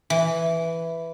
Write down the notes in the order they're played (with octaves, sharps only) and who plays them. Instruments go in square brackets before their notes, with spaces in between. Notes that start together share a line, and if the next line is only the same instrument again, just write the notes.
[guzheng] E3